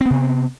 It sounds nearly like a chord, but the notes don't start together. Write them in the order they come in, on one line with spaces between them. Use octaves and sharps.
C4 B3 C3